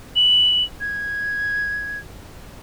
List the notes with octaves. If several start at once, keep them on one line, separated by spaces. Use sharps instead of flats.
F#7
G#6